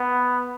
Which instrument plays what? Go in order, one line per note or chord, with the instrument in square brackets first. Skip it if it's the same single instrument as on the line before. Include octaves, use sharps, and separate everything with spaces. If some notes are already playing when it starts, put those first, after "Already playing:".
Already playing: [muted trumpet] B3